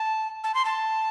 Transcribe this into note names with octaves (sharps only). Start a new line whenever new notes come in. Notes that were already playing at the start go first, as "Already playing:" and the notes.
Already playing: A5
A5
C6
A5